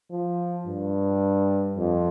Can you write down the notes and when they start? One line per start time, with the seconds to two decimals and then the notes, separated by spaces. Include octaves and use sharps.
0.11 F3
0.66 G2
1.77 F2